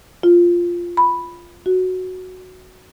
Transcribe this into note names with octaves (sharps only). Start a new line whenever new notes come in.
F4
B5
F#4